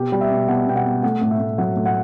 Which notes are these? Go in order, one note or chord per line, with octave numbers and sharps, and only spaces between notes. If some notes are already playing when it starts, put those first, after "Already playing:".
Already playing: B2 G4
G3
E5
B2
B2 F#5
B2 G5
F#5
B2
A3 F#5
A2
E5
A2
F#3 F#5
A2
F#5